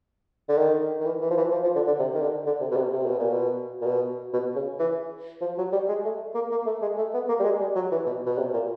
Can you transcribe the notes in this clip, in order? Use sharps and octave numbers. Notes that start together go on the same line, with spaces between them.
D3
D#3
D#3
E3
E3
F3
E3
F3
F3
D3
D3
C3
D#3
D3
D3
C3
B2
C3
C3
B2
A#2
B2
A#2
B2
B2
C#3
E3
F3
F#3
G3
G#3
A3
A#3
A#3
A3
G#3
A3
B3
A#3
G3
G#3
G3
F#3
E3
B2
B2
C3
A#2